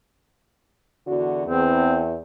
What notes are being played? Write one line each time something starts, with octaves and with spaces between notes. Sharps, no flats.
E2 D3 F#4
E2 C4